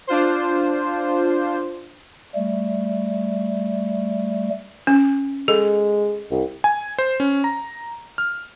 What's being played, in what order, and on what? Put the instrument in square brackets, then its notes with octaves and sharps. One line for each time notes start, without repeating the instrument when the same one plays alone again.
[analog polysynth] D4 F4 C5
[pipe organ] G3 A3
[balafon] C#4
[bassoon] G#3 [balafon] A4
[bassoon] C2
[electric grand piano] G#5
C5
C#4
A#5
F6